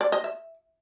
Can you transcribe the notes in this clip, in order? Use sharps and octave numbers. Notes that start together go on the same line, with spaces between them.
D5
D#5
E5